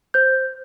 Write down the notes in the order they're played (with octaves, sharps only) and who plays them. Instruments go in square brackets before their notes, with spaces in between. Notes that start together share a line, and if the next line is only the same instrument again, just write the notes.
[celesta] C5 G6